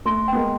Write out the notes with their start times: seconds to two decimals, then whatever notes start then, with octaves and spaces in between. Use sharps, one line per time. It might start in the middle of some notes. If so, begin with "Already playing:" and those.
0.05 A3 C6
0.28 B3 G5
0.35 G#3 A#3